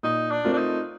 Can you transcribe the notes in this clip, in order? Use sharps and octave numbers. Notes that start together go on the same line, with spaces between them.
A#2 D#4
D4
A3 C4 F4 A#4
D4
D#4